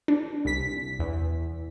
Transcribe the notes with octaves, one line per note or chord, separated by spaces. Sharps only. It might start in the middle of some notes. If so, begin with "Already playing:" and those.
D4
C2 B6
E2